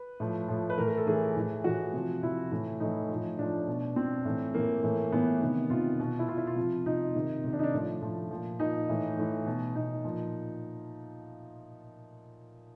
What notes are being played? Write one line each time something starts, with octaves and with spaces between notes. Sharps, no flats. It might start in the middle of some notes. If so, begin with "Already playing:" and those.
Already playing: B4
A2 F3
A2 F3
B4
A2 E3 A#4
A#4
A4
A2 E3 G#4
A2 E3
A2 E3 F#4
C3 F3
C3 F3 E4
A2 E3
A2 E3 D#4
F3
A2
A2 F3 D4
B2
B2 C4
A2 E3
A2 E3 A#3
A2 E3
A2 E3 B3
C3 D#3
C3 D#3 F4
B2
E4
B2 F4
E4
F4
C3 F3
C3 F3 D#4
C3 D#3
C3 D#3
D4
D#4
D4
A2 F3
A2 F3
A#2 F3
A#2 F3 D#4
A2 E3
A2 E3
B2
B2 D#4
A#2 F3